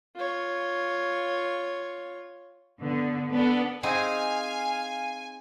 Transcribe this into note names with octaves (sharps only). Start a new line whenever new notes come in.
F4 C#5
D3 B3
B3 D4 A4
C4 D#4 G#4 F5 G#5